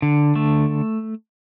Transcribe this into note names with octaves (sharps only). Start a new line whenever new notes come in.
D3
A3